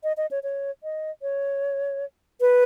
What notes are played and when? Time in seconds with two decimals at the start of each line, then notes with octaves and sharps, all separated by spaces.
0.04 D#5
0.17 D#5
0.31 C#5
0.43 C#5
0.83 D#5
1.22 C#5
2.41 B4